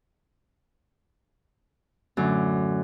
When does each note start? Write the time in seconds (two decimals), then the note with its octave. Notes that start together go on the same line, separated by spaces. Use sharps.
2.17 F#2 A2 D3 D6